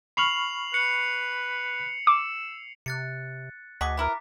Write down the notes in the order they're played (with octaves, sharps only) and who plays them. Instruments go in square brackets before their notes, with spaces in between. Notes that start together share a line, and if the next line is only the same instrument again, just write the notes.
[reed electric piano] B5 C#6 F6 [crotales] C7 F7 F#7
[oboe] B4 [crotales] C#7 F#7
[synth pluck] D6 [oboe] E6
[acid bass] C3 [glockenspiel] F#6 A6 C#7
[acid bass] D2 [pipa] F#4 G#4 D#5 [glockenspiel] D6 B6
[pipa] E3 E4 A#4 [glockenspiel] A#5